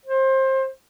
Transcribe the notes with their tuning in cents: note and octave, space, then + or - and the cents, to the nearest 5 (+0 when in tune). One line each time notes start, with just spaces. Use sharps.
C5 +25